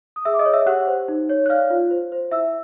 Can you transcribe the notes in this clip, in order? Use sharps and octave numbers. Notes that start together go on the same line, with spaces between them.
D#6
G#4 E5 E6
D6
D#5 D#6
C#5
E5 E6
G4 F#5 F#6
C5
D#4
C#5
F#6
D5 F5 F6
F4
C5
C5
E4 E5 E6